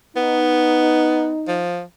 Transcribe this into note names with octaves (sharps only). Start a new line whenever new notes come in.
B3 D#4
F3